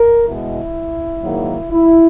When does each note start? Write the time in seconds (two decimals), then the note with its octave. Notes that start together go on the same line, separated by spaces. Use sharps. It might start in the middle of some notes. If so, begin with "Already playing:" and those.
Already playing: A#4
0.27 B2 G#3 E4
1.22 G#2 D#3 F#3 A#3
1.71 E4